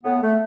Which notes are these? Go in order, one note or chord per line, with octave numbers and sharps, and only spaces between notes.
A2 B3
A3